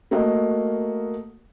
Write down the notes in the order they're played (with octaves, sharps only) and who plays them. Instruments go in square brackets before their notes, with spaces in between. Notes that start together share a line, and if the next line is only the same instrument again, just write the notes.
[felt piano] A3 A#3 F#4 A#4 D#5